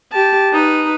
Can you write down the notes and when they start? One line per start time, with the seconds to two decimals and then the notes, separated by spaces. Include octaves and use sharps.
0.12 G4 A5
0.53 D#4 B4